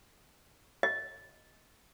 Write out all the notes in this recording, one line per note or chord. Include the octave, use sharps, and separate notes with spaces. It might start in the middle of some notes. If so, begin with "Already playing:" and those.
D#5